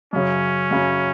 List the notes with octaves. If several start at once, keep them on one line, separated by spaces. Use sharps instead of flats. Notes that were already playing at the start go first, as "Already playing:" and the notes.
F#2 C#3 F#3 C#4
F#2 C#3 F#3